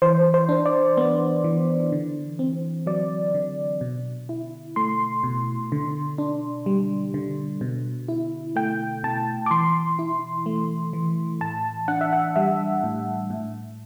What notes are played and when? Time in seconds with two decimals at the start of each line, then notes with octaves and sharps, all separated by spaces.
0.02 E3 C5
0.34 C5
0.49 D4
0.66 D5
0.97 B3
1.44 E3
1.92 D3
2.39 C4
2.86 F#3 D5
3.34 D3
3.81 B2
4.29 E4
4.76 A3 C6
5.23 B2
5.72 D3
6.18 D4
6.66 G3
7.14 D3
7.61 B2
8.08 E4
8.56 A3 G5
9.03 B2 A5
9.46 D6
9.51 E3 C6
9.99 E4
10.46 A3
10.93 E3
11.41 A2 A5
11.88 D4 F#5
12.01 E5
12.13 F#5
12.36 G3 E5
12.84 A2
13.30 A2